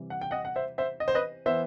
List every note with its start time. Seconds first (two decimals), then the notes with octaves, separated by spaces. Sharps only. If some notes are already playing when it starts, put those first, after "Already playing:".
Already playing: C3 E3 G3
0.10 F#5
0.21 G5
0.31 D#5 F#5
0.45 F#5
0.56 C5 E5
0.78 C5 E5
1.00 D#5
1.08 C5
1.14 B4 D#5
1.46 E3 B3 C5 E5